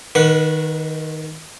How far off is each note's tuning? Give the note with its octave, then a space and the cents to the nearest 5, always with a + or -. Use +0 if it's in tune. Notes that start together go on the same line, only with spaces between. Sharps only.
D#3 +0 B4 -30 F#5 +0